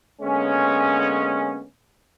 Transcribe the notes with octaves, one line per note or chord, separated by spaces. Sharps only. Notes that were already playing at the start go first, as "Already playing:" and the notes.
D3 G#3 A#3 B3 C#4